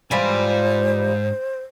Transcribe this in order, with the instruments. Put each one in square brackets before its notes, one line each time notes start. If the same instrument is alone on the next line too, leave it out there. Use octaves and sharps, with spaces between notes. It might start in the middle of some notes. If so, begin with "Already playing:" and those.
[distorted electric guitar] G#2 G#5 [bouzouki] E3 G3 F4 [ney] C5